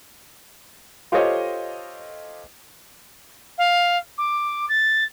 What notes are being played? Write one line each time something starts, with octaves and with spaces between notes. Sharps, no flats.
F4 G4 A4 C5 C#5 D#5
F5
D6
A6